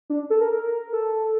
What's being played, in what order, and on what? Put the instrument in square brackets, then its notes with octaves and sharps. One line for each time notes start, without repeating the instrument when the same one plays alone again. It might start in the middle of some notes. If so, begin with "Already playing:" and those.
[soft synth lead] D4
A4
A#4
A4